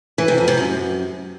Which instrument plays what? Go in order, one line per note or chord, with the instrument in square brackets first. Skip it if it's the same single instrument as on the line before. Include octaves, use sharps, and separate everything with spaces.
[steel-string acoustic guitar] E3
C3
F2
C3
F#2